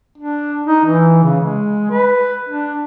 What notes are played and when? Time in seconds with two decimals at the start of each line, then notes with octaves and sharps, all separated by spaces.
0.18 D4
0.66 D#4
0.85 E3
1.23 C#3
1.39 G#3
1.91 B4
2.49 D4